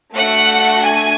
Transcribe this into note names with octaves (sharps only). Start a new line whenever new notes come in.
A3 D4 F#4 F#5
G#5